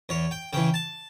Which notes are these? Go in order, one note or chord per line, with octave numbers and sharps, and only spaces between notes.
E2 C#5
G5
C#3 E3 G5
A5